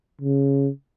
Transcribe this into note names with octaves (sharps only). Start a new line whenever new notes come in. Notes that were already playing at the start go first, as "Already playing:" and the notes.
C#3